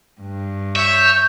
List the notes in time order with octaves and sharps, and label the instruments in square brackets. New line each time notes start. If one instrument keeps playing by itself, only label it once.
[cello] G2
[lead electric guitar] C#5 [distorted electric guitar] E5 [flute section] G6